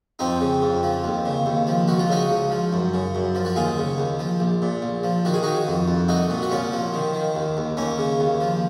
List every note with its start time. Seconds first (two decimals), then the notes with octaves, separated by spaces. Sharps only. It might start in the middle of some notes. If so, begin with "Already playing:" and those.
0.19 F2 C4 D#4
0.41 C#3
0.62 F2
0.83 F3
1.04 D#2
1.25 C#3
1.46 D#2
1.67 F3
1.88 C#2 F#4
1.99 F4
2.09 C#3 D#4 F#4
2.30 C#2
2.51 F3
2.73 F#2
2.94 C#3
3.15 F#2
3.35 F3
3.45 F#4
3.56 D#2 F4 G#4
3.78 C#3
3.98 D#2
4.19 F3
4.40 A#1
4.62 A#2
4.82 A#1
5.03 F3
5.25 D#3 F#4
5.34 G#4
5.43 D#3 D#4 F#4
5.67 F2
5.88 F2
6.08 C2 D#4 F#4
6.30 A#2
6.42 F#4
6.51 C2 C#4 F4
6.72 F3
6.94 D#3
7.14 D#3
7.35 D#2
7.57 D#2
7.77 D#2 A#3 C#4
7.98 C#3
8.20 D#2
8.40 F3